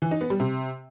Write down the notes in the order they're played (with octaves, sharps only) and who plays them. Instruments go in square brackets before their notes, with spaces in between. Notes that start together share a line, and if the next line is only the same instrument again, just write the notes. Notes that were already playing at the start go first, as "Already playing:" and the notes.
[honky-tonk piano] E3
D#4
B3
G3
C3